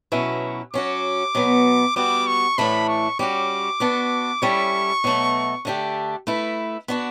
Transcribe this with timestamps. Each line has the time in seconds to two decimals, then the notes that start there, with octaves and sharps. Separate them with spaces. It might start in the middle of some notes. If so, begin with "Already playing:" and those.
0.12 B2 F#3 C#4 E4 B4
0.73 F#3 C#4 F#4 D6
1.35 B2 F#3 B3
1.96 G3 B3 F#4 D6
2.27 C#6
2.58 A2 E3 A3 D4 B5
2.88 C#6
3.19 G3 C#4 F#4 D6
3.80 B3 D4 F#4
4.42 G3 C#4 E4 A4 C#6
5.04 B2 F#3 A3
5.65 D3 A3 D4 G4
6.27 A3 E4 B4
6.88 B3 D4 F#4